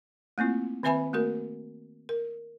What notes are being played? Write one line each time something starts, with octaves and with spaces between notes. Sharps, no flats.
A3 A#3 C4 E4 F4
D#3 C4 B4 E5 G#5 B5
A3 A#3 F#4 A#4
A#4